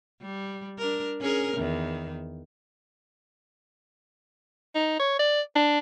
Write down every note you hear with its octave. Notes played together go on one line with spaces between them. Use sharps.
G3
D4 A#4
C#4 G#4 A#4
E2 D#3
D#4
C#5
D5
D4